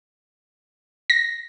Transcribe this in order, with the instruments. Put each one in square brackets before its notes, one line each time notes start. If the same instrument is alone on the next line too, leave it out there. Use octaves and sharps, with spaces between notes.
[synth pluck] A#6